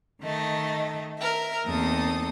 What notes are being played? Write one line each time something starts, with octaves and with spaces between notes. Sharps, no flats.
D#3 A3 D#5
A#4 E5
E2 A#3 C4 D#4 A4 D#6